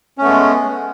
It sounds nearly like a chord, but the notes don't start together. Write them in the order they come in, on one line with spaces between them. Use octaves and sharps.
C#4 A3 B3 G#3